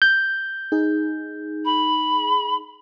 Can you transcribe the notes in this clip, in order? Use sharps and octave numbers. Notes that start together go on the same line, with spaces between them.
G6
D#4 G#4
B5